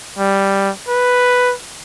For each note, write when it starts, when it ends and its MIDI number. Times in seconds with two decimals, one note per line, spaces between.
0.18 0.70 55
0.88 1.54 71